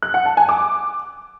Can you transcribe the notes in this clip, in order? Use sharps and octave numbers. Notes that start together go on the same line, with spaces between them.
F#6
F#5
A5
G#5
D6